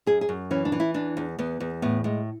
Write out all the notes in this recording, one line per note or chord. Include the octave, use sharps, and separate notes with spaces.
F#2 G#4
G#4
F#2
E3 C#4
D4
E3
E4
E2 D4
E2
E2 B3
E2
A2 B3
A2 G#3